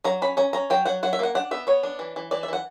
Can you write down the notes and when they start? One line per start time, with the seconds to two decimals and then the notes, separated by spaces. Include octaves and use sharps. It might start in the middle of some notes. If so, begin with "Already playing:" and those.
0.04 F#3 A#5
0.22 C#4 B5
0.37 C#4 A#5
0.53 C#4 A#5
0.70 F#3 G5
0.85 F#3 F#5
1.03 F#3 F#5
1.13 E5
1.19 A#3 F#5
1.35 D4 F#5
1.51 B3 E5
1.67 B3 C#5
1.83 D4
1.99 E3
2.16 E3
2.31 E3 D5
2.43 E5
2.48 E3 F#5